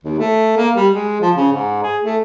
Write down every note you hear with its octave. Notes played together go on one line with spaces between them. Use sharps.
D#2
A3
A#3
G3
G#3
F3
C#3
G#2
G#4
A3